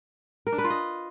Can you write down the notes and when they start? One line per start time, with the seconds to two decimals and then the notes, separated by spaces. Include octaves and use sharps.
0.47 A#4
0.52 D4
0.58 B4
0.64 F4
0.70 D#5